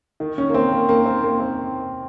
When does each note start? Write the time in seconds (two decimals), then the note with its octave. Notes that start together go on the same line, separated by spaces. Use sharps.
0.20 D#3
0.38 C#4
0.50 A#3
0.54 C4
0.72 A#3
0.89 A#3
1.06 C4
1.24 A#3
1.40 C4